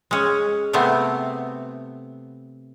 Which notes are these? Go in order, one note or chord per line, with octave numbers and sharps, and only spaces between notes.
G#3 C#4
C3 A3 B3 C4